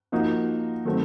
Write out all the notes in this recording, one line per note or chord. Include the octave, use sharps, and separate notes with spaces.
F3 A#3 D#4 F#4
D#3 F#3 A3 C4